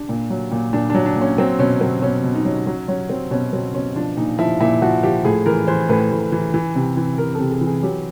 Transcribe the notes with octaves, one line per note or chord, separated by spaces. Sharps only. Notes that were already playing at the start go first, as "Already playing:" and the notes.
Already playing: D4
A#2
F#3
A#2
A#2 D4
F#3 D4
D4
A#2
C#4
F#3 C4
B2 C#4
F#3 C4
B2 C#4
B2
D#4
F#3
F#3 C#4
F#3 C#4
F#3 C4
B2 C#4
F#3 C4
B2 C#4
F3 D4
A#2 D#4
F3 E4
A#2 E4
F3 F#4
F3 G4
A2 G#4
E3 A#4
E3 C5
A2 B4
A2
E3
E3
C3
E3
E3 A#4
C3 A4
G#4
E3
G#4
F#3 G4